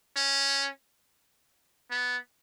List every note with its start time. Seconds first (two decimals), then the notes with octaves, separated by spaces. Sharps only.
0.16 C#4
1.91 B3